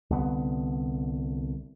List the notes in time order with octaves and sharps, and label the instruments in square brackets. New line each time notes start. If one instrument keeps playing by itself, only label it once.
[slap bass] C2 D3 B3